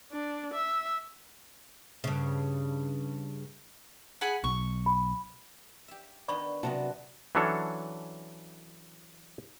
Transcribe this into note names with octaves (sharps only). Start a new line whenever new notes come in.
D4
E5
G2 C#3
G#4 F#5 B5
B1 C#6
B5
G4 E5
D#3 B3 D4 D5 B5 C#6
C3 F#3 G3 B3 F#4 A5
E3 F#3 C#4 D4 A4 C#5